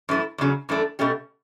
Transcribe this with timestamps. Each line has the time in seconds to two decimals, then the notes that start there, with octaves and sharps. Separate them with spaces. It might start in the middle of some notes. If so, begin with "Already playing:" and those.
0.09 F#2 E3 A3 E4
0.38 E2 C#3 F#3
0.69 F#2 E3 A3 D4
0.99 B2 A3 C#4 G4